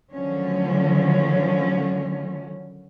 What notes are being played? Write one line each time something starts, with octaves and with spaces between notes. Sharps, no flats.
D3 D#3 F3 F#3 A3 C#4